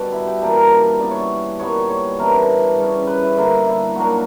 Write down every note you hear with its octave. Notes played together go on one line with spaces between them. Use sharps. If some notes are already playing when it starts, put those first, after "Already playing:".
Already playing: B2 G3 B3 D4 B4
E4
G4
E3 A#3 D4 G4
A#4
D5
E3 B3 D4 D5
C#5
D5
A#2 G3 B3 C#5
C#5
E3 B3 D4 A#4
A#4
C#3 G3 C#4
B4
E4
D3 A#3 D4 E4
E4
A#2 F#3 A#3 D4 F#4